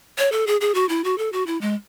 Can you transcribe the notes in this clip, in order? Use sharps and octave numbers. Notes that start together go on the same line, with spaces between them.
C#5
A4
G#4
G#4
F#4
E4
F#4
A4
F#4
E4
G#3